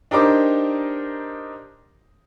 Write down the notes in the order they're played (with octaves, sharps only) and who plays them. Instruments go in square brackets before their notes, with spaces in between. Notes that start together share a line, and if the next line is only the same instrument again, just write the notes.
[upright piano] D4 D#4 G4 A#4 C5 D6